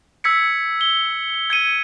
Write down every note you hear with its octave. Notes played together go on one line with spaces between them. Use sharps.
E6 G#6 B6 C#7
G7
G#6 C#7 D#7